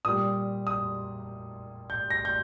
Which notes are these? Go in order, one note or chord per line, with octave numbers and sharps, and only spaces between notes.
A#2 G3 D#6
D#6
G6
A#6
G6